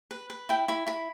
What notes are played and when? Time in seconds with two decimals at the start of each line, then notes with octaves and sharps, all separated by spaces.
0.11 B4
0.30 B4
0.49 E4 G5
0.68 E4 B5
0.87 E4 B5